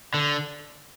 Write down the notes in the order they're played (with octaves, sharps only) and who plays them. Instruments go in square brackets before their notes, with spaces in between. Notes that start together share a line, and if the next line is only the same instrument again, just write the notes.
[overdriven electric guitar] D3